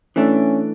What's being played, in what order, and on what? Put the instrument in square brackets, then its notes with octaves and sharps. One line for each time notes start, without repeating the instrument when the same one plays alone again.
[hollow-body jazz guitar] E3 A3 D4 [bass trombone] C#4